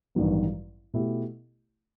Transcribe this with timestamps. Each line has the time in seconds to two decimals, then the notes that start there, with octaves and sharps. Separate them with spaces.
0.15 A1 G2 D#3 F#3 B3
0.94 B2 A3 E4 G4